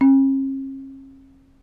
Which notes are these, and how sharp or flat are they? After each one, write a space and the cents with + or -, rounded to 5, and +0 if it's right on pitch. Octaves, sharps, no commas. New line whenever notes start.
C#4 -45